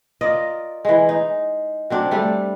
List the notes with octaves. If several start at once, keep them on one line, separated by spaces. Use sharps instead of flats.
F4 A#4 D5 D#5
E3 G#3
D#4
F#3 C4 D4
G3 A3 D4